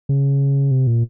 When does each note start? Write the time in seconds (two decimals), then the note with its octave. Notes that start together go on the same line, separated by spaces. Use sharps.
0.09 C#3
0.71 C3
0.87 A#2